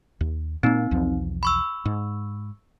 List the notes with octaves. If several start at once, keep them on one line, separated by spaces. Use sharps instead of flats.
D#2
A#2 A#3 C4 D#4
B1 E2 F3
B5 C#6 E6
G#2